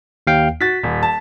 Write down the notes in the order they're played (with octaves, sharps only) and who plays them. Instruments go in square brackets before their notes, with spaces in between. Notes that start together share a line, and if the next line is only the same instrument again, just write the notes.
[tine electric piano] D#2 F5 G5
[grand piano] F#4 A6 [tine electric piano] B6
[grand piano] D#1
A5